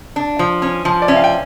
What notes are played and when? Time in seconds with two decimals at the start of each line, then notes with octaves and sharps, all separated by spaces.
0.16 D4
0.39 F3
0.62 C#4
0.85 F3
1.02 D5
1.08 C#4 E5
1.16 F5
1.24 G5